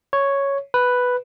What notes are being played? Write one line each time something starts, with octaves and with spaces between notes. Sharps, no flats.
C#5
B4